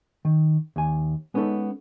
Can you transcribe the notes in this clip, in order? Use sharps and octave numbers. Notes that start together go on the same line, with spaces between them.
D#3
D#2 G#5
G#3 B3 C#4 D#4 A4